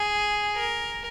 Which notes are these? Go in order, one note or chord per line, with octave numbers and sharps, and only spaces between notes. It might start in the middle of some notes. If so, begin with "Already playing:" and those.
Already playing: G#4
A#4